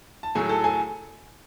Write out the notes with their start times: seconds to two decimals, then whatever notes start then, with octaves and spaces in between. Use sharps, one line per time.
0.23 A5
0.35 A2 F#3 A3 G#4 G#5
0.49 A4 A5
0.64 G#4 G#5